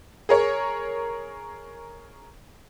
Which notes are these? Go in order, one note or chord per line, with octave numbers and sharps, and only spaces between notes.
G#4 A#4 C#5